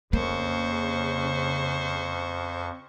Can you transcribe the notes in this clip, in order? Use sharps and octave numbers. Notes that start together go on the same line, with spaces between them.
F2 C#3 A#3 C5 C#6